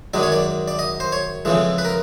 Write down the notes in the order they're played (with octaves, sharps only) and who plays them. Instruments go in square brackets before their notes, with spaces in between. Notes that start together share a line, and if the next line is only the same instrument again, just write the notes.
[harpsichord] F#2 D#3 G#3 D5
C#5
D5
D5
D#5
C5
C#5
F2 C#3 E3 G#3
B4
A#4